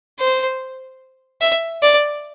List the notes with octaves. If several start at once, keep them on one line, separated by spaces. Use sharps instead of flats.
C5
E5
D5